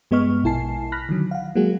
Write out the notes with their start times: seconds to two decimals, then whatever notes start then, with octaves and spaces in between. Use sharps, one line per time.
0.11 G2 G#3 B3 D#5 C#6 F6
0.44 A#1 B2 E4 G#5 A5 C7
0.92 B5 F6 F#6 A#6 B6
1.09 D3 D#3 F#3
1.31 F5 F#5
1.55 F#3 G#3 A#3 F#4 G#4